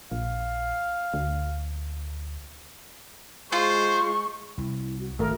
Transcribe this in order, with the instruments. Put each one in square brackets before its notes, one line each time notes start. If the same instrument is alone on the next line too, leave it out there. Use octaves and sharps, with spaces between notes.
[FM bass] A#1 [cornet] F5
[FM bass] D2
[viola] G#3 [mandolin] F4 [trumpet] C5 [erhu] C#6
[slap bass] C2 [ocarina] E4
[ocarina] F#4
[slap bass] G#1 A#2 [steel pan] A3 A#4